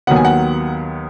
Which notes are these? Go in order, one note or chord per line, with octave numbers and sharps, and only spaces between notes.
D#2 D#3 F#3 B3 F#5
G#5
F#5